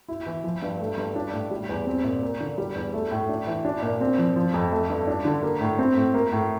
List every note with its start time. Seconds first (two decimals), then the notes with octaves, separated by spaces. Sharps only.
0.08 E4
0.26 E3
0.44 F3
0.62 G2
0.80 A3
0.98 G2
1.16 D4
1.33 A2
1.51 G3
1.69 E2
1.87 C4
2.04 A#2
2.22 A#3
2.40 D3
2.58 G3
2.75 E2
2.94 A3
3.11 A2
3.29 D4
3.47 E3
3.65 D4
3.82 A#2
4.01 C4
4.18 F3
4.36 F3
4.54 F2
4.72 A3
4.90 G2
5.07 D4
5.25 D3
5.43 A#3
5.61 A2
5.78 C4
5.96 A2
6.14 A#3
6.32 A2